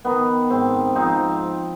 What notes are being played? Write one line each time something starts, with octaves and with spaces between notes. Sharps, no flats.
D#3 B3
G#2 C4
F3 C4 D#4